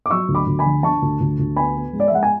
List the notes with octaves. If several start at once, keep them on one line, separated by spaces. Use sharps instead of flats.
D6
F#3 C#6 E6
D2
B5 D6
D2
G#5 B5
D3
D3 A5 C#6
D2
D2
D2
B3 G#5 B5
B3
G#3
D5
E5
G#3 F#5
G#5